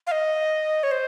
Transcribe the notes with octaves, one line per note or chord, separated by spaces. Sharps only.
F5
D#5
C#5
C5